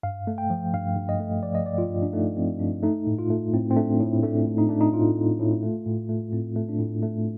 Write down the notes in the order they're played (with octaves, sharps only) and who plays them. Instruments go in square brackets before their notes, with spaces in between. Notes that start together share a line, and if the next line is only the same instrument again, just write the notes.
[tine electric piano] G2 F5
A3
G5
F3
G2 F5
G2
D#5
A3
F3 D5
D#5
G2 D5
F4
G2
D4
A3 D#4
F3 C4
G2 D4
A3 D#4
A2
F4
A3
A2 C4
C4
A3 D4
A2
A3 D4
A2
D#4
A3 D4
D#4
A2 F4
A3
A2
A3
A2
A3
A2 C4
A3
D4
A2
A3